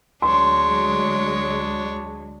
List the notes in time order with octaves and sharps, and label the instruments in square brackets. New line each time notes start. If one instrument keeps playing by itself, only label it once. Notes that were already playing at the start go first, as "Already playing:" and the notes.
[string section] D2 F#3 G#3 [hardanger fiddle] D4 C#5 [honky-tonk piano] C6